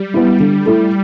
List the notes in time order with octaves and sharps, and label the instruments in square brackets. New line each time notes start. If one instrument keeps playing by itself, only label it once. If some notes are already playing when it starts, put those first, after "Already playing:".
Already playing: [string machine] G3
[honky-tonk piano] B3 E4
D3
A3 E4